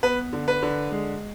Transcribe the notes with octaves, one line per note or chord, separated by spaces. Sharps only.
B3 B4
D3
B4
D3
G#3